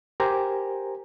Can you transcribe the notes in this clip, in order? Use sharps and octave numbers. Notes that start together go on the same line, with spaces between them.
G4 A#4 C5 G#5 A#5